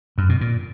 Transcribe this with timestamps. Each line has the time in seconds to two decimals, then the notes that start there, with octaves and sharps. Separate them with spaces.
0.18 F#2
0.29 B2
0.41 A#2